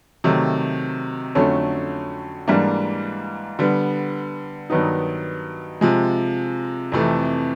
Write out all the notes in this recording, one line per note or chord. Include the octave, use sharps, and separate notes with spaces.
C3 D#3 F#3 A3
F2 D3 F#3 A3 C#4
G#2 E3 G3 A#3 D4
D3 G3 B3
G2 D#3 F#3 B3 D#4
C3 F3 G#3
F2 C3 E3 A3